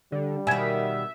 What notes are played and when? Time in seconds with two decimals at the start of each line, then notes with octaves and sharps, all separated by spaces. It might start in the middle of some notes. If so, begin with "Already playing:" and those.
0.12 D3 G3
0.47 B2 D#3 E5 G#5 G#6